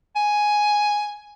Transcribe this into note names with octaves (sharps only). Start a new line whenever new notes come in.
G#5